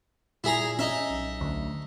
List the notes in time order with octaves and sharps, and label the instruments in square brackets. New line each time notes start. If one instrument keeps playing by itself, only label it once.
[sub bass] A#2 [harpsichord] E4 G#4 A#5
[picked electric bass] C#4 [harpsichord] D#4 E5
[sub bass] B1
[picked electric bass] D2